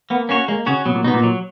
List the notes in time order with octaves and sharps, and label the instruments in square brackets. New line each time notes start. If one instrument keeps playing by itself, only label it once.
[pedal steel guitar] A#3 [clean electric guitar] B3
[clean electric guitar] A#3 [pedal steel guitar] C#4 F#4 C#5
[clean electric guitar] G#3 [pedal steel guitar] A#3
[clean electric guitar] C#3 [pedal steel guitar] C#4 F#4 C#5
[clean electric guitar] B2 [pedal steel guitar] F#3
[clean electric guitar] A#2
[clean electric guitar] B2 [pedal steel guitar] B3 D#4
[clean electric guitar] A#2
[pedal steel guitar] F#3